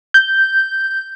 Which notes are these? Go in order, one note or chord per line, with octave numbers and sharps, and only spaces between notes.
G6